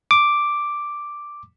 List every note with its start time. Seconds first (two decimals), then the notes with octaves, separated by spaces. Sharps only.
0.11 D6